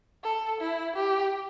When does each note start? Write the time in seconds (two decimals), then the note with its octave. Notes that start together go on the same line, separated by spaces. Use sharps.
0.24 A4
0.61 E4
0.96 G4